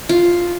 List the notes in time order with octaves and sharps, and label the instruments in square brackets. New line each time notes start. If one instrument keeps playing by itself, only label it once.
[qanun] F4